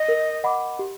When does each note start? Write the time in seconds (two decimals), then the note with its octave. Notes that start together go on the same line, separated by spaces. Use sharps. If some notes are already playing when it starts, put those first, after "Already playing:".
Already playing: D#5
0.08 A#4
0.44 D#5 F#5 B5 D6
0.79 G4